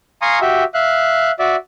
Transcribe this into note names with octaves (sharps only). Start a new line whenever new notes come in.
F5 G#5 A#5 C6 C#6 D#6
F#4 G4 E5
E5 F5 F#6
F#4 D5 E5